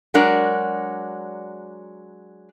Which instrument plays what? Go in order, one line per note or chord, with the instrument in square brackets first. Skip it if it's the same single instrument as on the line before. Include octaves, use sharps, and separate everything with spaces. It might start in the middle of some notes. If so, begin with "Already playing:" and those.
[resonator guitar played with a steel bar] F#3 G#3 D4 F#4 A#4 D5